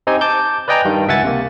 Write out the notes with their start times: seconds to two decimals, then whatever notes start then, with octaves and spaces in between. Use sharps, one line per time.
0.07 C4 D#4 G4 G#5
0.21 A5 D6 G6
0.68 B4 D5 D#5 G5 G#5 A#5
0.85 G2 D#3
1.08 C#2 E5 F#5 G#5 A6
1.24 C3 A#3